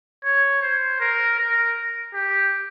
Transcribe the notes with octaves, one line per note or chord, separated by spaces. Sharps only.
C#5
C5
A#4
A#4
G4